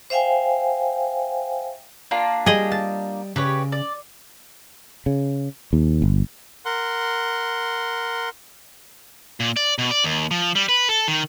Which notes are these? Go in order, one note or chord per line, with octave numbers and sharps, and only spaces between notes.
C5 E5 F5 G5 G#5
A#3 D4 F4
G3 G#4 D#5
A5
C#3 G4 B4 C#5
D5
C#3
D#2
G1
A#4 F#5 C6
A#2
D5
B2
D5
D#2
F3
G3
B4
A4
D#3